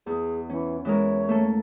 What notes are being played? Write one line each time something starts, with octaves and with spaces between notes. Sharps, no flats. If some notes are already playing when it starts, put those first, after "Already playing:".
E2 G#4
E3 C#4
E3 G#3 A#4 C#5
A3 A#3 A4